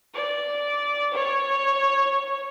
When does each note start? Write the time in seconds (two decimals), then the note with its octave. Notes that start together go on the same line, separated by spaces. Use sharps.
0.14 D5
1.13 C#5